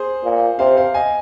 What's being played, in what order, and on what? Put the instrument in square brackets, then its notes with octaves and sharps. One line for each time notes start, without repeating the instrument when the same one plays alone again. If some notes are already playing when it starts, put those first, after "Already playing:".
Already playing: [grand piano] G#4 C5
[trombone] A#2
[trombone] C3 [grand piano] C5 F5
[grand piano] C5 F5
D#5 G#5